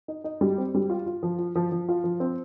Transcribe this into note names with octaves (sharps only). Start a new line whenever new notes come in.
D#4
D#4
G3
C4
G3
F4
F4
F3
F4
F3
F3
F4
F3
C4